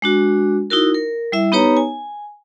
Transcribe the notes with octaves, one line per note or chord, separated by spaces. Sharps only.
G#3 D4 F#4
D#4 E4 F#4 A#4
A#4
G3 E4 E5
B3 D#4 G4 B4 C#5 A#5
G#5